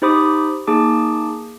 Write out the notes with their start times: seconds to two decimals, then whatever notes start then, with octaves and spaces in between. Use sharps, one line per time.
0.02 D#4 G4 C5 B5 D6 D#6
0.67 A#3 D#4 G#4 A5 D6